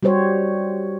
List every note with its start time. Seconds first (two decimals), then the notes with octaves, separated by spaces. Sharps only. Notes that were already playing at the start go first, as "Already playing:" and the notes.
0.03 G3 F#4 G4 C5 C#5